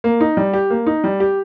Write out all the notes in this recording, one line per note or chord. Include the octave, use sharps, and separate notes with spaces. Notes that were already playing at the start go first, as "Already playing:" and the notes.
A#3
D#4
G3
G4
A#3
D#4
G3
G4